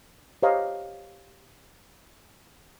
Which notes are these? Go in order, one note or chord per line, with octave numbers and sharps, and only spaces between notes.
G4 C5 C#5 D#5 F5 A#5